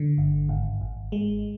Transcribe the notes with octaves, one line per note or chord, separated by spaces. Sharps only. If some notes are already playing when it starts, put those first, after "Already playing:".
Already playing: D3
G1
G#1
G#1
G#3